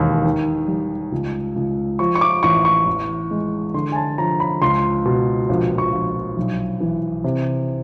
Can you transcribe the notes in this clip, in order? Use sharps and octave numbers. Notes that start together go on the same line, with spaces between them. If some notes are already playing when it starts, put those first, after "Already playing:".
Already playing: E1 D#2
D#3
G3
C#2
C#2
F3 C#6
C#6
D6
A1 C#6
C#6
E2
G#3
D3 C6
G#5
A5
F3 A#5
B5
C#2 C6
B2
A#1
C#6
A#1
B1
E3
C3